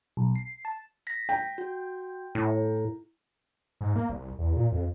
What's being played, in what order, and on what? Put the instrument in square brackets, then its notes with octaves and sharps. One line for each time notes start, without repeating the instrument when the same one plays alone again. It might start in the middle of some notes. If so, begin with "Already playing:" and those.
[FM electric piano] B1
C7
A5
[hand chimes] A#6 B6
[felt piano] G5
[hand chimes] F#4
[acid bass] A2 [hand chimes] E4
[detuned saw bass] G#2
A#3
C2
E2
A#2
F2